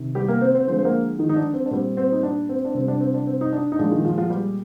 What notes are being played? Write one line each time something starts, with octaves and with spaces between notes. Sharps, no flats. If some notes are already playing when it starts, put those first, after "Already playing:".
Already playing: C3 D#3
G3 G4
A#3 A#4
C4 C5
C4 C5
D3 F3 G#3 C4 C5
C5
A#3 A#4
D#3 D#4
D#4
D4
C4
D4
A#2 G3 C4
C4
D#4
D4
C4
D4
C3 G3 C4
D4
C4
D4
C4
D#4
D4
D#4
A#2 F3 G#3 D4
D#3 D#4
F3 F4
F3 F4
G3 G4